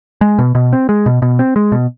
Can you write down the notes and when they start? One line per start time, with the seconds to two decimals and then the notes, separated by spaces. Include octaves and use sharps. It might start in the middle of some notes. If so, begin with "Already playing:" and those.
0.21 G#3
0.39 B2
0.55 B2
0.73 C4
0.89 G#3
1.06 B2
1.22 B2
1.39 C4
1.56 G#3
1.72 B2